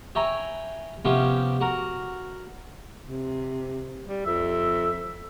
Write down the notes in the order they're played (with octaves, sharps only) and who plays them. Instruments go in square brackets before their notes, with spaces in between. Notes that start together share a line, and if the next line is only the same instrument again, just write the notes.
[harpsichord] C#5 E5 G5 G#5 A#5 B5
C3 F3 B3 C#4 G4
F#4 A#4
[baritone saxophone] C3
G3
[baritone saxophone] F2 [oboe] E5